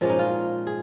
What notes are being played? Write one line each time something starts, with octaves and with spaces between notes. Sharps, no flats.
A#2 F3 G#3 C#4 F4
D#4
F4
G#4